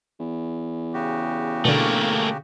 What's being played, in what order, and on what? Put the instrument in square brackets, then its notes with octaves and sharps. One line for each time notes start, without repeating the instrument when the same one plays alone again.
[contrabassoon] E2
[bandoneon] C#3 F#4 G4
[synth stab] B2 D3 [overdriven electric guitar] A3 A#3